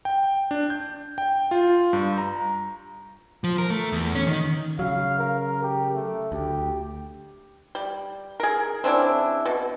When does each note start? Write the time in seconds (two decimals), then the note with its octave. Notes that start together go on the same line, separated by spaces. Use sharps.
0.05 G5
0.51 D4
0.70 G6
1.18 G5
1.51 F4
1.93 G2
2.18 A#5
3.44 F3
3.58 A#4
3.70 A3
3.92 E2
4.15 C#4
4.27 D#3
4.79 C#3 F#3 F5
5.18 A#4
5.62 G4
5.94 A3
6.32 D2 G4
7.75 G3
8.40 G#4 A#4
8.84 C#3 C4 D4 E4
9.45 B2